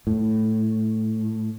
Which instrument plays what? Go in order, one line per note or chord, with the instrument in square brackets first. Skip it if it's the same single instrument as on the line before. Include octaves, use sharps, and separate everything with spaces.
[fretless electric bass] A2